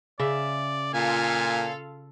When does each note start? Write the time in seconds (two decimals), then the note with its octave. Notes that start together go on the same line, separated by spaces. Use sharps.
0.20 C#3 D5 E5
0.94 A#2 F4 A4 F5 G#5